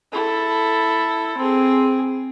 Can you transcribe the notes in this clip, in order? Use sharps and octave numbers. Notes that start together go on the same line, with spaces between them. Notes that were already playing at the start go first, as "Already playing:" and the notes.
E4 A4
C4 G#4